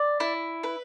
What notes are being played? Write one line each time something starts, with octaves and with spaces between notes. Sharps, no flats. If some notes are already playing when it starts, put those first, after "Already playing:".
Already playing: D5
E4
B4